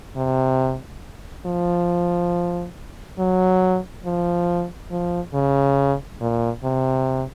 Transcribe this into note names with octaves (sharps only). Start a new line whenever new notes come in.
C3
F3
F#3
F3
F3
C#3
A#2
C3